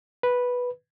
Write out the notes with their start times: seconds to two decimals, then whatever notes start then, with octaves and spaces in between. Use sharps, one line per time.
0.23 B4